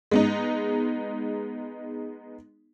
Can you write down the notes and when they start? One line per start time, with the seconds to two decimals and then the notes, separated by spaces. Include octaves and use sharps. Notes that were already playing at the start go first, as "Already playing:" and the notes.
0.11 G#3 B3 D#4